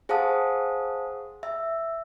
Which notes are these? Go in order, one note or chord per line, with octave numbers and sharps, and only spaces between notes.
G#4 C5 F5 F#5 A5 D#6
E5